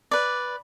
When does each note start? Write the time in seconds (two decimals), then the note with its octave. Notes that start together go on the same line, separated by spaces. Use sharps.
0.11 B4 D5